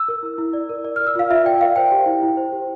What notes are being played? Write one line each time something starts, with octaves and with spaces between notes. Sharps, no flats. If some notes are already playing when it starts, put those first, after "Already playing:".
Already playing: E6
A#4
E4
E4
D5
A#4
D5
A#4 F6
E6
F4 F5
F4 E5
D5 G5
A#4 F5
C5 G5
G4
E4
E4
C5
G4